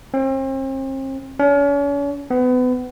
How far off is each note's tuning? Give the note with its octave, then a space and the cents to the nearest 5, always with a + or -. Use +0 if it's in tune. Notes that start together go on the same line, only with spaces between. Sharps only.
C4 +40
C#4 +40
B3 +30